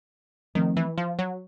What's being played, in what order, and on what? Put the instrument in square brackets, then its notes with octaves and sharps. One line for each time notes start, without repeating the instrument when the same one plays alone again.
[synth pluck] D#3 [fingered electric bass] F3 A3 C4
[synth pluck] E3
F3
F#3